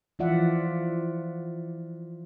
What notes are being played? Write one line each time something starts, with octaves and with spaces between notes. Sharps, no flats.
E3 F3 F4 D5 E5 F#5